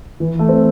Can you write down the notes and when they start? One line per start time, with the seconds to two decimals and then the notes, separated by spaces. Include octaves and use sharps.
0.20 E3
0.39 A3
0.49 C4